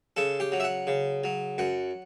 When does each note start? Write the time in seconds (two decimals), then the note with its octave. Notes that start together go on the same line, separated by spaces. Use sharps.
0.17 C#3 A4
0.40 G4
0.52 F#3
0.60 E5
0.64 F#5
0.87 C#3
1.24 F#3
1.58 F#2 F#5